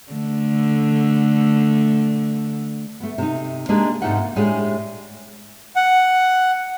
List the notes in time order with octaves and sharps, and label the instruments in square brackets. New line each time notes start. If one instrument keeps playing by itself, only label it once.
[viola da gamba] D3 A3
[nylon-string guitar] A3 B3
C3 D#4
G#3 A#3 D4 G4 G#4
G#2 C3 A3 D#4 F4 F#5
A#3
A2 G#3 D4 G4 G#4
[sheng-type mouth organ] F#5